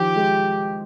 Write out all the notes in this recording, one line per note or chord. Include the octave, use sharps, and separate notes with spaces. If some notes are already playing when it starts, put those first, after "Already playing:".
Already playing: D#3 F3 G4
G#3